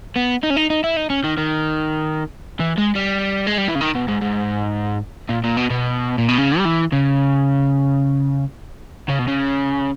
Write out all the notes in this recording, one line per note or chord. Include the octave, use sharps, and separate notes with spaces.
B3
D#4
C#4
D#4
D#4
E4
D#4
C#4
D#3
D#3
E3
G#3
G3
G#3
G3
E3
C#3
D#3
B2
G#2
G#2
A#2
A#2
B2
B2
A#2
B2
C#3
G3
E3
C#3
C#3
B2
C#3